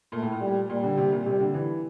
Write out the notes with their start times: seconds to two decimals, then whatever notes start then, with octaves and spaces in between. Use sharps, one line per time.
0.12 A#2 A3
0.22 A2
0.32 A#2
0.41 G3
0.69 A#2 G3
0.83 D3
0.97 C3
1.12 A#2
1.26 C3 G3
1.40 D3
1.54 E3